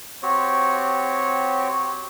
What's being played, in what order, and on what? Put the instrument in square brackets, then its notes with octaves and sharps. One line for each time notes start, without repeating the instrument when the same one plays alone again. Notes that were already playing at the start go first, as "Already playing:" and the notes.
[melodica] C4 F#4 G4 C#5